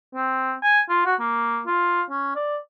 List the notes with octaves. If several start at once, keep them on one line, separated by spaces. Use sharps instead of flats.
C4
G#5
F4
F#4
A#3
F4
C#4
D5